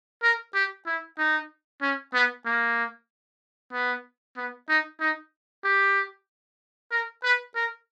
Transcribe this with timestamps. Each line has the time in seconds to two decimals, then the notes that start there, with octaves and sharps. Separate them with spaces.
0.23 A#4
0.54 G4
0.86 E4
1.18 D#4
1.82 C#4
2.14 B3
2.46 A#3
3.73 B3
4.37 B3
4.69 D#4
5.01 D#4
5.65 G4
6.92 A#4
7.24 B4
7.56 A#4